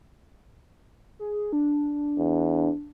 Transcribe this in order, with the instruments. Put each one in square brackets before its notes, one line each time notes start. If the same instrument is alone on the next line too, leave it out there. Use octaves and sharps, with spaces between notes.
[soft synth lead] G#4
D4
[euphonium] E2